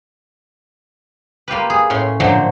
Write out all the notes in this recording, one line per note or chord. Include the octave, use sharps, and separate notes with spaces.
A#3 F4 G4 B4
G#4
A2 C#4 C6
A#2 D3 F3 F#3 A3 C5